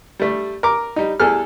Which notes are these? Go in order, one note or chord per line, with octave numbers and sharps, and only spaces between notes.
G3 A3
A#4 D6
G3 D#4
E2 G3 G#4 A4 F6